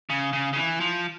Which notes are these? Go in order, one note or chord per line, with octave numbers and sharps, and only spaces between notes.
C#3
C#3
C#3
E3
F3